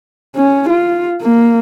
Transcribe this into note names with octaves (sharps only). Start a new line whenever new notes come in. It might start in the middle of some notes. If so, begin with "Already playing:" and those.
C#4
F4
A#3